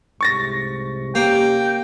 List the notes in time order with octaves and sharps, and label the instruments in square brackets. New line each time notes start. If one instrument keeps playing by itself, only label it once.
[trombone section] C2 G#2 C3 [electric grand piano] C#6 A6 A#6
[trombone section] C3 C#4 G4 [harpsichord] A#3 [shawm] G5